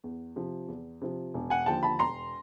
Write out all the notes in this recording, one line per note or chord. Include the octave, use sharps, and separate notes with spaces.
E2
C3 F3
E2
C3 F3
E1
F#5 G#5
D#2 D3 F3 G5 A5
A5 B5
E1 A#5 C6